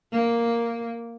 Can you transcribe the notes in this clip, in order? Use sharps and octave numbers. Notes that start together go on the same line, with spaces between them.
A#3